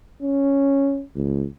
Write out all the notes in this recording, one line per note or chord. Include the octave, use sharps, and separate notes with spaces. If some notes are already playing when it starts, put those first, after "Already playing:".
C#4
C#2